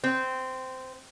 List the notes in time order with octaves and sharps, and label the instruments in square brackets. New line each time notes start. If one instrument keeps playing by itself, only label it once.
[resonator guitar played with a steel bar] C4